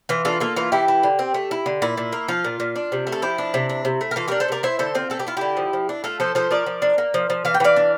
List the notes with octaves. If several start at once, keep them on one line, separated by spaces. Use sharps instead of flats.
E3 F4
D4 F4 A4
A#3 F4 A4
E3 F4
E3 E4 G4
E4
D3
C4
A3
E4
D3
A#2 E4
A#2
A#3
F3 F4
A#2
A#2
D4
C3
A3
A4
F3 E4 G4
D4
C3
D4
C3
A3
A#4
E3 F4 A4
D4 G4 A#4
A4 C5
C3 A#4 D5
E4 C5 E5
D3 A4 C5
C4 F4
A3 A4
G4
E4 F4
D3 E4 G4
F3
F3
D4
A3 F4 A4
F3 A4 C5
F3 A4 C5
F3 A#4 D5
F3
D4
A#3
F3
F3
E3 F5
G5
E3 D5 F5
D4